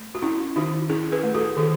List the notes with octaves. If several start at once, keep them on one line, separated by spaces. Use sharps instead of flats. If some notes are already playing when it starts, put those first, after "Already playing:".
Already playing: A3
F#4
C#4 E4
D#3 D#4 F#4
C#4 E4 G#4
G#4 B4
A3
F#4 A4
D#3 F#4 A4